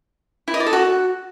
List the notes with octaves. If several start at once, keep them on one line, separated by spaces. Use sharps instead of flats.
E4
D#5
D5
A4
F#4